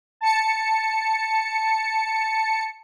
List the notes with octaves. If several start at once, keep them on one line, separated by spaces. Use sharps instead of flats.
A5 C#7